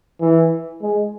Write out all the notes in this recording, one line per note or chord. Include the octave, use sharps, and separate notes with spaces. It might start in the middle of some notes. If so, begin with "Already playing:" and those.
E3
G#3